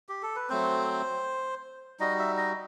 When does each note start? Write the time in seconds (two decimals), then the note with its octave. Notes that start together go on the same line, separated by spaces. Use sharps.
0.09 G4
0.23 A4
0.36 B4
0.49 F#3 A3 C4 C5
2.00 G3 D#4 F#4 D#5
2.19 E5
2.37 D#5